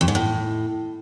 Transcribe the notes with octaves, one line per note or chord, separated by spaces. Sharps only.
F2
G#2
A2